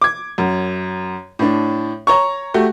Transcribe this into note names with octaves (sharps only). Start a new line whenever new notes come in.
D6 G#6
F#2
A2 D4
C#5 A#5 C#6
A3 F#4 G4